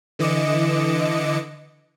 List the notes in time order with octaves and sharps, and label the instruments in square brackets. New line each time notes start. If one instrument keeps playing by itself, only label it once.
[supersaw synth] D3 E3 D#5 D6 C#7 E7